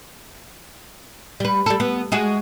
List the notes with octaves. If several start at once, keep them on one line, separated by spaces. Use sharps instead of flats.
G3 B4
G3 A4
B3
G#3 F#4 G#4